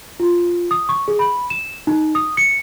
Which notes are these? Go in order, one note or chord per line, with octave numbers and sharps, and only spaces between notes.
F4
D#6
C#6
G#4
B5
E7
D#4
D#6
C#7